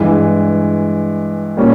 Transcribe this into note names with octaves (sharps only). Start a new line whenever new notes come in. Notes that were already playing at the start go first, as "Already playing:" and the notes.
Already playing: G2 E3 G#3
A#2 G3 A#3 C#4